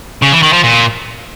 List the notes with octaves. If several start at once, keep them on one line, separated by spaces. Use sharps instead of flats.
C#3
E3
D#3
F3
A#2